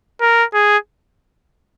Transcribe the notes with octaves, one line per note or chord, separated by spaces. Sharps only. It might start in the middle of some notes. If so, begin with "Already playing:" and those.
A#4
G#4